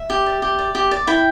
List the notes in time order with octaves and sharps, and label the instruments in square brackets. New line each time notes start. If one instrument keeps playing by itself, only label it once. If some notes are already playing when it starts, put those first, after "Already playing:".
Already playing: [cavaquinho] E5
G4
D5
G4
D5
G4
D5
E4 G5